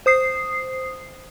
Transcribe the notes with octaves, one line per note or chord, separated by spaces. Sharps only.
C5 D#6 C7